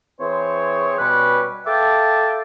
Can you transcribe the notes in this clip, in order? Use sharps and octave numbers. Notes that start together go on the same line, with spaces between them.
E3 C4 G#4 C5 C#5
B2 G3 C#4 B4
A4 E5 F5 G5 A5 D6